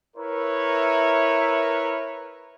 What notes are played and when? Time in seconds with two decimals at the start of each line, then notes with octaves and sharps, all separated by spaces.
0.16 E4 A#4 B4 C#5